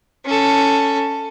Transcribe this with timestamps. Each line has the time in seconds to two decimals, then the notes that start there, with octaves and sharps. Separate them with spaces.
0.25 C#4 A4